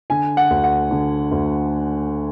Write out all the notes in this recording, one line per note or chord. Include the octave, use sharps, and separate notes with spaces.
D3 G#5
F#5
D2
F#5
D3
D2